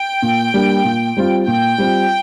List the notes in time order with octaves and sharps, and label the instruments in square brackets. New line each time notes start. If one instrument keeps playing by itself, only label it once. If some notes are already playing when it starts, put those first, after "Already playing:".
Already playing: [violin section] G5
[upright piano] A#2
G3 A#3 D4
A#2
G3 C4 F4
[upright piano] A#2 [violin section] G5
[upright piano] G3 C4 F4